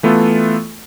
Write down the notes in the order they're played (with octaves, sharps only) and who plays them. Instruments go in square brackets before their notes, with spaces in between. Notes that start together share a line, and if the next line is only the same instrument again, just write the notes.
[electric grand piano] E3 A3 B3 F4 A4